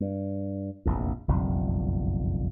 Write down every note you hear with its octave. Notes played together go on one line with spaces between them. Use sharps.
G2
F1 A#1 E2
F#1 B1 F2 G3